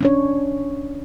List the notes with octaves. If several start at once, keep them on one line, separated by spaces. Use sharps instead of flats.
C#4 D4 C#5